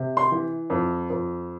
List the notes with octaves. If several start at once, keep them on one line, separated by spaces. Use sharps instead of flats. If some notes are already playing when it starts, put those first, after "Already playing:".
Already playing: C3
C6
E3
F2
F2